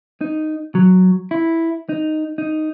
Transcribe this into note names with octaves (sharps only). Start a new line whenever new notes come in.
D#4
F#3
E4
D#4
D#4